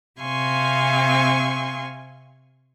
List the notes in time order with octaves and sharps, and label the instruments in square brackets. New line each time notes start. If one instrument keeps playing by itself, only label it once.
[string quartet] C3 C4 F5 G#5 C6 C#6